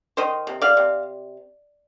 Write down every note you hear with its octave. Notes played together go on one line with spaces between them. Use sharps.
D#3 C5 D#5
C3
D5 F5
C3